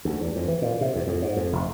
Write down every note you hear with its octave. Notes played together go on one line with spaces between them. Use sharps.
D2
E2
F2
E3
A#2
C3
E2
F2
G#2
F2
F1